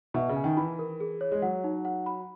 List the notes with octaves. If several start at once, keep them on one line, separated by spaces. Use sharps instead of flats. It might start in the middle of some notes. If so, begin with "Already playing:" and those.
B2 E5
C#3
G#5
D#3
E3 B5
A#4
G#4
C#5
G#3
F#3 F#5
D#4
F#5
B5